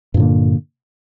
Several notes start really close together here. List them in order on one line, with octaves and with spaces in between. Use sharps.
G2 A#2 D3 A#3